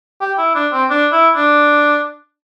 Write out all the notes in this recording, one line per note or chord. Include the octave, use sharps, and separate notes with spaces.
G4
E4
D4
C4
D4
E4
D4